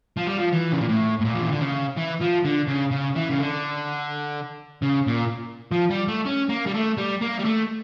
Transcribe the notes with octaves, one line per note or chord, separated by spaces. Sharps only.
F3
G3
F3
E3
C#3
A#2
A2
A2
A#2
F3
E3
D3
C#3
E3
F3
D3
C#3
C#3
E3
C#3
D3
C#3
A#2
F3
G3
A3
C#4
A#3
G3
A3
G3
A#3
G3
A3